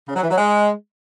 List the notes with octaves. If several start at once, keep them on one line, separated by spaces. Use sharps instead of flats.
C#3
F#3
E3
F#3
G#3